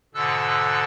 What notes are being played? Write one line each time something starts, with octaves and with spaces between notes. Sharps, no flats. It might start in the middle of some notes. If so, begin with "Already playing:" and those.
G#2 B2 D3 A4 E6 F#6